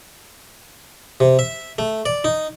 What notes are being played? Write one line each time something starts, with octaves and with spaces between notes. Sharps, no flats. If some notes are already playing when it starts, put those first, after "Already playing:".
C3
E5
A3
D5
D#4